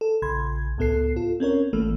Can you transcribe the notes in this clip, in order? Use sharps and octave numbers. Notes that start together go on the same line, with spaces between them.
A4
A#1 C#3 B5 C6 G#6
C#2 A2 B3 A4 C7
F4 A4
C4 C#4 A#4 C#5
A1 E3 A3 A#3 A4